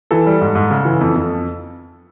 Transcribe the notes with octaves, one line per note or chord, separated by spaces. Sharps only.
E3 A4
G3
G#2
G#2
C#3
E3
F2
F2